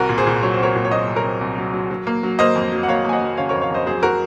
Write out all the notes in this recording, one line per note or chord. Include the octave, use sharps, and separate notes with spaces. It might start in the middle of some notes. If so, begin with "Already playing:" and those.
Already playing: C2 F#4 A#4
A#2
G#4 C5
A#2
F#3 C#5
C5
C4 A#4 C#5
A#2
C#5
F#3 C5 D#5
C2
A#4 C#5
C4
C2
F#3
F#3
F#3
A#3
F#3
A#3 C5 D#5
F2
F#3
F#5
A#3 C#5 F5
A#3 G#5
D#5 F#5
F#3
C#3 C#5 F5
A#4 C#5
F2
C#5 F5
F2 C5 D#5
F#3 G#4 C5
F#3 F#4 A#4